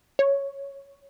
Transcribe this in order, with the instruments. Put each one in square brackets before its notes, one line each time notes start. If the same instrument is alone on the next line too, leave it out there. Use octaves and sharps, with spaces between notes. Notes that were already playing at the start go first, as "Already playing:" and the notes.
[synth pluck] C#5